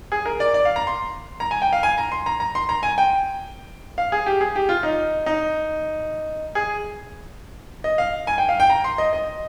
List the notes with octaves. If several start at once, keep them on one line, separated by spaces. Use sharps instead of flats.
G#4
A#4
D5
D5
F5
A#5
C6
A#5
G#5
G5
F5
G#5
A#5
C6
A#5
A#5
C6
A#5
G#5
G5
F5
G#4
G4
G#4
G4
F4
D#4
D#4
G#4
D#5
F5
G#5
G5
F5
G5
A#5
C6
D#5
D#5